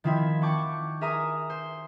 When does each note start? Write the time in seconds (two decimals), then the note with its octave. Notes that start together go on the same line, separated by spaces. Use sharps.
0.04 D#3 F3 C4 E4 E5 G#6
0.42 F#5 G5 A5 C#6 D6 G6
1.01 G#4 A#4 E5 G#5 A#5 D#6
1.50 C5